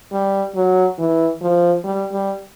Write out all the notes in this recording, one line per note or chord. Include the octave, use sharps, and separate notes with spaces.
G3
F#3
E3
F3
G3
G3